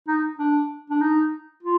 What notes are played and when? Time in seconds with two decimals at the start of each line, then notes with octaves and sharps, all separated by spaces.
0.08 D#4
0.39 D4
0.90 D4
1.01 D#4
1.63 F4